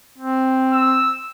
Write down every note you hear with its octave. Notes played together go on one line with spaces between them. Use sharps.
C4
E6